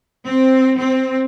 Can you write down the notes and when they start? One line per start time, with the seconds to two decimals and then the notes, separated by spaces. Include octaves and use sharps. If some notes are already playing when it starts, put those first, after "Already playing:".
0.24 C4
0.78 C4